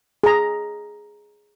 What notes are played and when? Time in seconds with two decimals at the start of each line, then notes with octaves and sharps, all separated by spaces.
0.24 G#4 A#5